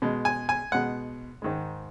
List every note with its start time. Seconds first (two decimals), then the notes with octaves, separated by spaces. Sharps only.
0.02 B2 G#3
0.25 G#5
0.49 G#5
0.72 B2 G#3 F#5
1.42 G#2 D#3 G#3